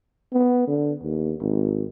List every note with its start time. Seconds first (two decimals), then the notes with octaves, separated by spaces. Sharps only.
0.33 B3
0.68 D3
1.03 D#2
1.41 G#1